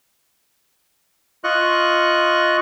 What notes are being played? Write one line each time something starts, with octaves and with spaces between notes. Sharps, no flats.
F4 D#5 C#6 F#6